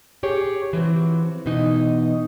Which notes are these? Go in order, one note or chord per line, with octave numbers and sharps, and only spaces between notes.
G4 G#4 C#5
E3 F3 C4 F#4
B2 E3 D#4 D#5